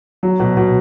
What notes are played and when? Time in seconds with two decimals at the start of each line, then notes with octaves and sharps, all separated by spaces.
0.23 F#3
0.40 B2
0.57 B2